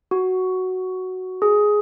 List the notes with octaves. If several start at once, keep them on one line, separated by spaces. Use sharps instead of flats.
F#4
G#4